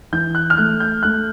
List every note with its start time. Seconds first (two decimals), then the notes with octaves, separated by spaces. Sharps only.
0.12 E3 G6
0.35 F#6
0.50 F6
0.57 A3 F#6
0.80 G6
1.03 A3 F#6